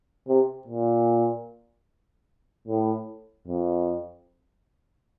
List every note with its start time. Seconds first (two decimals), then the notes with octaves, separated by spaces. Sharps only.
0.28 C3
0.67 A#2
2.67 A2
3.47 F2